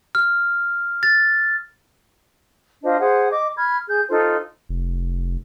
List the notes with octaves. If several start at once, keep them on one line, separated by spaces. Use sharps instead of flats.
F6
A6
D4 F4 C5 D#5
G#4 C5 F#5
D#5 D6
B5 F6 G#6
G#4 G6
D#4 F4 A4 C5
F1